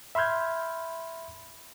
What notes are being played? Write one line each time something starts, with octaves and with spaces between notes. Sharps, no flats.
E5 B5 C6 F6 G6 G#6